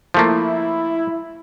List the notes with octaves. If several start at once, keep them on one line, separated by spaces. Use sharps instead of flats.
F3 A3 A#3 E4